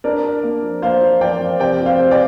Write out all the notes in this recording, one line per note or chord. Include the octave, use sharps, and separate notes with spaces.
D4 A#4 D5
D4
A#3
F3
A#3 C5 F5
F3
F3 D5 G5
F3
C3 D5 G5
F3
C5 F5
C3
D5 G5